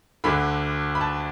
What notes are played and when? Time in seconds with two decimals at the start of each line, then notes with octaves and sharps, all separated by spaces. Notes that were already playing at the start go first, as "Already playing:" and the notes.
0.24 D2 D3 B5
0.95 B5
1.01 A5